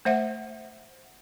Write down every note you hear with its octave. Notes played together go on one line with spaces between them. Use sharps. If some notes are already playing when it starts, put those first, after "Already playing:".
A3 C5 E5 F#5